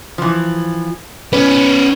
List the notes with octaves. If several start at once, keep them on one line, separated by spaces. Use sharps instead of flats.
E3 F3
B3 C#4 B4